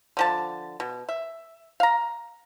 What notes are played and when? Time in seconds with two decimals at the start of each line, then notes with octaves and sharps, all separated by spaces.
0.17 D3 F3 A5
0.80 B2
1.09 E5
1.80 F5 A#5